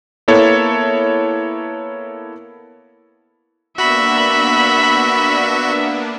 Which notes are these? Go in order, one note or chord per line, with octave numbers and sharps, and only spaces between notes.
A#3 B3 E4 A4 C#5
A#3 B3 D4 F#4 E5 B5